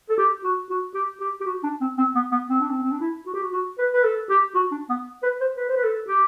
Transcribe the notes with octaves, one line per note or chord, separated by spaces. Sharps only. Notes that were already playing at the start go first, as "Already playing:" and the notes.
A4
G4
F#4
F#4
G4
G4
G4
F#4
D4
C4
C4
B3
B3
C4
D4
C4
C4
D4
E4
F#4
G4
F#4
F#4
B4
B4
A4
G4
F#4
D4
B3
B4
C5
B4
C5
B4
A4
G4